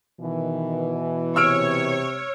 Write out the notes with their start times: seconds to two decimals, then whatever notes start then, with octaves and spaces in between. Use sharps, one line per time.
0.20 B2 D#3 E3
1.36 C3 C#5 E6 F6 D7